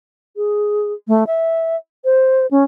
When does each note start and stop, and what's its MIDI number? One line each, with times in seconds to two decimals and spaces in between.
0.36 0.92 68
1.08 1.24 57
1.27 1.76 76
2.05 2.46 72
2.51 2.64 61